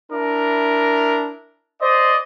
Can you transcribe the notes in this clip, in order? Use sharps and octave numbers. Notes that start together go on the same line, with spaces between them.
D4 E4 A#4
C5 D5 D#5